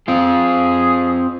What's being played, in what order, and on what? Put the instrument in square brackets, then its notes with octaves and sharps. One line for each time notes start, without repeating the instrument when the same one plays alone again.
[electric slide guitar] C4 F4 [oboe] G#4